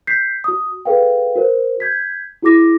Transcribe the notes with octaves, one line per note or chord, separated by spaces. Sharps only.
G6 B6 C7
F#4 D#6
G#4 A4 B4 F5 G5
F#4 A#4 C5
G6 G#6 B6
E4 F#4 G#4 D6 A#6